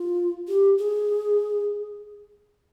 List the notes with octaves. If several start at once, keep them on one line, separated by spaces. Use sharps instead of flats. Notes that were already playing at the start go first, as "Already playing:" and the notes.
Already playing: F4
G4
G#4